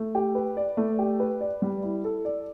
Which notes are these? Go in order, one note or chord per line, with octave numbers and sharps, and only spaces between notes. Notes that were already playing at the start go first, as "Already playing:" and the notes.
Already playing: A3
G4
B4
D5
A3
G4
B4
D5
G3
E4
A4
D5